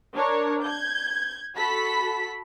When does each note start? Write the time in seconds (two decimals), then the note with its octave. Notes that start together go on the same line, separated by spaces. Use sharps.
0.15 D4 A#4 C#5
0.64 G6 G#6
1.57 F#4 A4 B5 B6